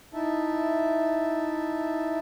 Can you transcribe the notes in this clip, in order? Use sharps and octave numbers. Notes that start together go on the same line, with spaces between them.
D#4 E4 E5 A5